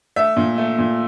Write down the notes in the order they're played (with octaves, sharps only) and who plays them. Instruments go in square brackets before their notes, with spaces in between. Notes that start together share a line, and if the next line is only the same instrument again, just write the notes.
[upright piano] A3 E5
A#2
A3
A#2